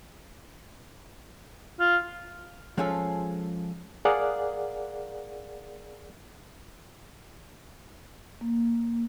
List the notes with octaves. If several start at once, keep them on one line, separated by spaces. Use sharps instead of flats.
F4
F3 G#3 C#4 F4 G#4 A4
G#4 A#4 D5 F5 F#5
A#3